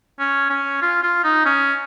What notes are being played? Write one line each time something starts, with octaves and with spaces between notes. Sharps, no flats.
C#4
C#4
F4
F4
D#4
C#4